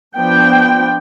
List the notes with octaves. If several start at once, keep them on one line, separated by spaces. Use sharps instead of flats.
F3 B3 D4 G5